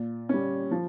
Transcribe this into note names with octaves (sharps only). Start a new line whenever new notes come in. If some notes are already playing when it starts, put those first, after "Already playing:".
Already playing: A#2
G3 C#4
F3